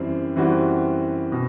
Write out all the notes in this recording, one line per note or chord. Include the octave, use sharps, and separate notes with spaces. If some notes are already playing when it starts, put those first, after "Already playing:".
Already playing: F#2 E3 G3 C4
F#2 E3 G3 C4 F#4
B2